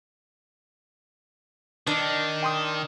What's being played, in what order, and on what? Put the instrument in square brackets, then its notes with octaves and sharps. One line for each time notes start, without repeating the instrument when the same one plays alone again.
[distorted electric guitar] D#3 [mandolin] D4
[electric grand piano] G5 C6 D#6